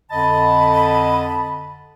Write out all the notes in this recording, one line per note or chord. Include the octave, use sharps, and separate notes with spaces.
F2 D3 D#5 A5 B5